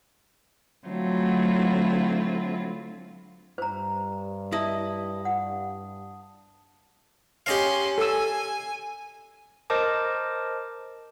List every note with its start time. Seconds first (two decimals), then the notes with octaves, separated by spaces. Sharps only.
0.87 D3 F#3 A3 C4 E4 F4
3.58 G2 C5 A#5
4.52 E4 D#5 A5 D#6
5.25 F#5
7.46 C#4 G4 D#5 F5 C6
7.98 A4 G#5 E6
9.70 A#4 C5 D#5 A5 D6